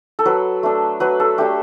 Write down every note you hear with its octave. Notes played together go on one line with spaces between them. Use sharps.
A4
F#3 B4
A3 D4
F#3 B4
A4
A3 D4 G4